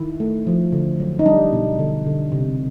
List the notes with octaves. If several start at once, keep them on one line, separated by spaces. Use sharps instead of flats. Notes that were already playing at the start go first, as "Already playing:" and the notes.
Already playing: D#3 E4
A3
F3
D3
F#3
D#4
G3 D4
B2
D3
D3
C3